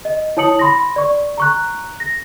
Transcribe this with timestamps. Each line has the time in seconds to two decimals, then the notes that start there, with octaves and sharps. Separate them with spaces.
0.05 D#5
0.37 E4 C#5 A5 D#6 C#7 F#7
0.59 B5 C6 A#6
0.96 D5 C#6
1.38 A#5 C#6 F#6
2.00 A#6